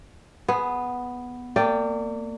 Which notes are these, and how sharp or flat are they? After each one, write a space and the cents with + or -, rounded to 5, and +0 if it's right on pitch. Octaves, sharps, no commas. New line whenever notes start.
B3 +0 G#4 +10
A#3 -40 D5 +0 G5 +0